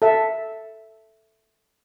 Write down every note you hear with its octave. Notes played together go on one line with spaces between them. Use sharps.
A4 E5